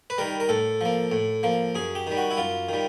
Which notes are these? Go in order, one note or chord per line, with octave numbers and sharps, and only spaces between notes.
B4
D#3 G3 A#4
A#4
A2 A4
F3 A#3
A2
F3 A#3
F#2 G#4
G4
D#3 G3
F#4
E4
F#2 F4
D#3 G3